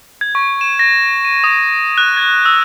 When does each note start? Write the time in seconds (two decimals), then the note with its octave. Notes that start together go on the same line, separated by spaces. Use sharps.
0.21 G#6
0.35 C#6
0.61 E7
0.79 A#6
1.25 D#7
1.44 D#6
1.98 F#6
2.17 G#6
2.46 E6